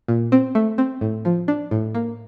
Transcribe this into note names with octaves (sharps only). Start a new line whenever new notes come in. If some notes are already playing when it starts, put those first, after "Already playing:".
A#2
C4
A3
C4
A2
F3
D4
A2
A#3